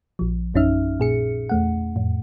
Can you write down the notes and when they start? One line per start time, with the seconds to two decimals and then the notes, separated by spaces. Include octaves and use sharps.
0.19 A#1 F3
0.54 A#1 F#2 C#4 D#4 E5 F6
1.00 A#2 G#4 C#7
1.49 E2 A3 F#5
1.96 F2 A2